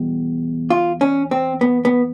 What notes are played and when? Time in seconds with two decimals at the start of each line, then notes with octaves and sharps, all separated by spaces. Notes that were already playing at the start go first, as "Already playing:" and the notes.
Already playing: E2 B2 G3
0.70 F4
1.01 C#4
1.31 C4
1.61 B3
1.85 B3